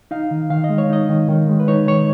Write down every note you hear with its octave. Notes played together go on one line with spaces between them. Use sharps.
D#4 F5
D#3
D#3 F5
D#5
G#3
C#5
D#4 D#5
D#3
D#3
G#3
B4
D#4 C#5
D#3 C#5